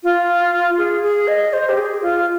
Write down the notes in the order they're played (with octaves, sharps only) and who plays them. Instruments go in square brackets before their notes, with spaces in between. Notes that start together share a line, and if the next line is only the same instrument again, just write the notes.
[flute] F4
G#4
G#4
D#5
C5
G4
G#4
F4